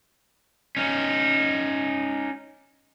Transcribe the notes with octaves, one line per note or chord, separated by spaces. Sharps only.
C#4 D#4